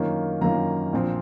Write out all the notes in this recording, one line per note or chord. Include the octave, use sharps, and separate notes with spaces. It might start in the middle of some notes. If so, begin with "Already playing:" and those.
Already playing: F#2 D#3 A#3 C#4 F4
F#2 D#3 A#3 C#4 F4 A#5
A#1 A#2 F3 C4